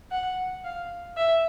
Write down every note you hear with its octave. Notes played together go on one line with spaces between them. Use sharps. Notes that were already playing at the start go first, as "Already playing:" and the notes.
F#5
F5
E5